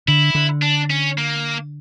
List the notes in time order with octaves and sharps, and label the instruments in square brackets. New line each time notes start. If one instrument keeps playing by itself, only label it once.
[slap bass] D3 [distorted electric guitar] E4
[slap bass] D3
[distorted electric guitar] D4
C#4
A#3